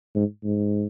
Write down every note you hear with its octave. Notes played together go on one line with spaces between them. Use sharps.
G#2
G#2